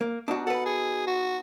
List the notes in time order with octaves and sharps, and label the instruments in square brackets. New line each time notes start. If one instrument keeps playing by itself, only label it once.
[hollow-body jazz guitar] A#3
[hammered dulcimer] B2 D#4 [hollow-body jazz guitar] D4 F#4
[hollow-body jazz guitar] A4 B4 [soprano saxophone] F#5
[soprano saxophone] G#4
F#4